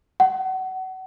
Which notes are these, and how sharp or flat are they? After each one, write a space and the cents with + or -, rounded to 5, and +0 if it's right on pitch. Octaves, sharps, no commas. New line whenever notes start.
F#5 +30